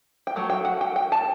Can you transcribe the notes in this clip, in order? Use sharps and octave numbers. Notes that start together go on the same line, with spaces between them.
G5
F#3 A3
G5
F#5
G5
G5
A5